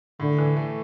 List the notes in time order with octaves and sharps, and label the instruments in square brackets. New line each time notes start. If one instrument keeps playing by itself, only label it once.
[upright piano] A2 [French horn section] D3
[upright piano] E3
A3